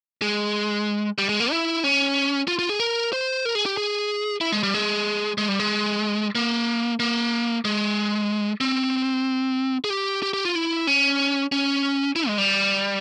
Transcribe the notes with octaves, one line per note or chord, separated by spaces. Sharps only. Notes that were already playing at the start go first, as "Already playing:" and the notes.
G#3
G3
G#3
A#3
E4
C#4
F4
F4
G#4
A#4
C5
A#4
G#4
G4
G#4
E4
G#3
G3
G#3
G#3
G3
G#3
A#3
A#3
G#3
C4
G#4
G4
G4
G4
F4
E4
C#4
C#4
E4
G#3
G3